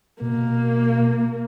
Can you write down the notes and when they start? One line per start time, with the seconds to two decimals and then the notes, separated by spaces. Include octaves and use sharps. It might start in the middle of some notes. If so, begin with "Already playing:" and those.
0.21 B2 A#3